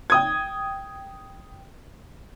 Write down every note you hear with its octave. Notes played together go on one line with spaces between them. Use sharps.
G5 D#6 G#6